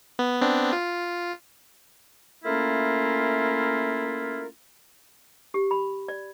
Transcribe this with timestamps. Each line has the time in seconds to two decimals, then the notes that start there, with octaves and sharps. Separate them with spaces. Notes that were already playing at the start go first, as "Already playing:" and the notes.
0.19 B3
0.41 B3 C4 D4
0.73 F4
2.45 A3 A#3 C#4 E4 F4 A#4
5.54 G4
5.71 B5
6.08 D5